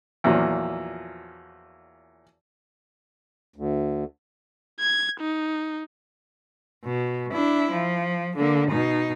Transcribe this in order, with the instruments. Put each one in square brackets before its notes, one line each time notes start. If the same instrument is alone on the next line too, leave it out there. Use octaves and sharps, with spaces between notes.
[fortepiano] E2 A#2 F3 F#3
[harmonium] D2
[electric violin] G#6
D#4
[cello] B2
D4 E4
F3
D3 A#3
B2 D#4